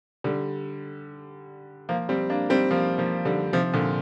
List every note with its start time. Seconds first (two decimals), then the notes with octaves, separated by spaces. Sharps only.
0.24 D3 G3
1.89 F3 A#3
2.09 G3 C4
2.30 A#3 D4
2.50 G3 C4
2.71 F3 A#3
2.98 F3 A#3
3.25 D3 G3
3.53 C3 F3
3.73 A#2 D3